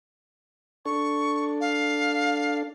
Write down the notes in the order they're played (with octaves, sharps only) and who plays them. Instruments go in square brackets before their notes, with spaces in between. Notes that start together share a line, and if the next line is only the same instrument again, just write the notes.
[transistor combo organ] D4 A4 [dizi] C#6
[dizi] F5